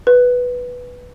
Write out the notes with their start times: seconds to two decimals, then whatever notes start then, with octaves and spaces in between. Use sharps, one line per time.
0.07 B4